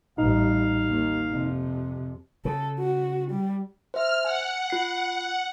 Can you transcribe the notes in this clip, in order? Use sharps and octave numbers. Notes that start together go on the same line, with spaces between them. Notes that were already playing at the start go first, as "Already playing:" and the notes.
A1 G3 D#4 F5
D#2
F2 C3
C#3 A4
F#4
G3
C5 E5 F6
F#5 G#5
F4 C7